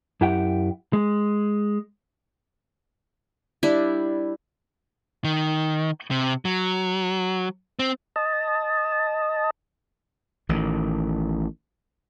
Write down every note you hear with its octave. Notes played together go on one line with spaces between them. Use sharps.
F#2 E4 G4 E5 F#5 G5
G#3
G3 D4 E4
D#3
C3
F#3
C4
D#5 A5
A1 A2 D#3